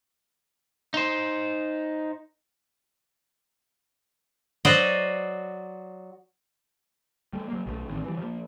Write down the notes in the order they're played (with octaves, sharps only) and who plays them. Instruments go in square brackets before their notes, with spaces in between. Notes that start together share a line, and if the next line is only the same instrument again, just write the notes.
[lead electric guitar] D#4 C5
[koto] F#3 F#4 C5 D5 D#5
[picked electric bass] G3 A3
F#3 A#3
B1 F3 A3
A1 D#3 C4
E3 G3
F3 A#3